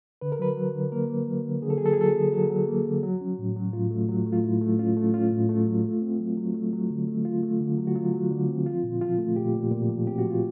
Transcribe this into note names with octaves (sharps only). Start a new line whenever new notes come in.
D3 B4
A#4
F#3 B4
F#3
D3
A#3 A#4
A#3
F#3
D3
D3 G#4
A4
F#3 G#4
A4
G#4
F#3 A4
G#4
D3
F#3 A4
F#3
A#3
D3
F#3 F#4
C#4
A2
F#3
A2 F4
A3
F#3
A3
F4
A2 E4
A3
C#4 F4
A3
C#4 F4
A2
A3
F#3
A3
C4
F#3
F#3
A3
F#3
D3
A3
F#3 F4
A3
D3
F#3
F#4
F#3 F4
F#3
D3
C4
F3 F4
A#2
F3 F4
A3
A#2 G4
A#2
A#2
F3
C4 G4
F#4
F3
F4